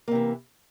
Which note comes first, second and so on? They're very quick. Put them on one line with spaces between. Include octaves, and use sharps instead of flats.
A#3 C3 E3